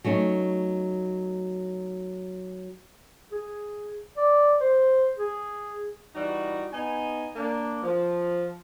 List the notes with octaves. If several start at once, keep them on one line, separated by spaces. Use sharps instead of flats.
F#3 A3 C#4 D#4
G#4
D5
C5
G#4
E3 G3 D#4 F#4
B3 D#4 G#5
A#3 D4
F3